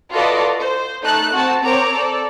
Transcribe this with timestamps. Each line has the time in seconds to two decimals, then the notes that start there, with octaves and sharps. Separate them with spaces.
0.12 F4 F#4 A4 B4 D5 D#5
0.59 C5
1.03 A3 D#4 A4 A5 F#6
1.33 C4 F#4 F#5 A5
1.64 C4 A#4 C#5 A#5 D6
1.95 A4 D5